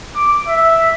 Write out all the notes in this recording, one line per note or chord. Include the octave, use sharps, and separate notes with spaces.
D6
E5